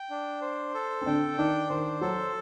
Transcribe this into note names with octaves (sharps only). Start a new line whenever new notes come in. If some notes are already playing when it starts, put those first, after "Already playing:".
Already playing: G5
D4
C5
A4
C4
D3 D4 G5
D#3 D4 D#4
D#3 D#4 C5
F#3 F#4 A4